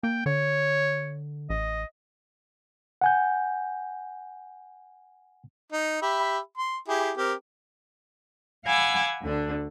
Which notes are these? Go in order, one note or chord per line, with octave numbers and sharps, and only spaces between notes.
A#3 G5
D3 C#5
A1 D#5
F#5 G#5 G6
D#4
G4 E5 B5
C6
E4 G4 G#4
C4 G4 A#4
F5 F#5 G#5 B5 D6 E6
D2 D3 D4